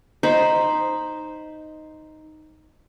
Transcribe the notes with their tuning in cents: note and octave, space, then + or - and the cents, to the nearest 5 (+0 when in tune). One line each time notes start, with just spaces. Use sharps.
D#4 +0 C5 +0 B5 +0